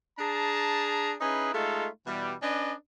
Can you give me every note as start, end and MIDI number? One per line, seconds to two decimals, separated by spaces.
0.19 1.14 62
0.19 1.14 68
0.19 1.14 81
0.19 1.14 82
1.21 1.52 61
1.21 1.52 63
1.21 1.52 64
1.21 1.52 68
1.21 1.52 71
1.53 1.88 56
1.53 1.88 57
1.53 1.88 63
1.53 1.88 65
1.53 1.88 69
2.07 2.34 47
2.07 2.34 52
2.07 2.34 55
2.42 2.73 61
2.42 2.73 62
2.42 2.73 71
2.42 2.73 74
2.42 2.73 75